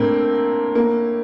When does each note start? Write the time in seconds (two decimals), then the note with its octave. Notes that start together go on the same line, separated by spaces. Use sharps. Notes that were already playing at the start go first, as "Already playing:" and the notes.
Already playing: A2 A3 A#3 C4 D4
0.75 A#3